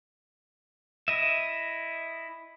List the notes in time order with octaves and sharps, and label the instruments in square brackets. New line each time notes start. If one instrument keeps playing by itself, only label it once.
[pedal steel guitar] E4 D#5 E5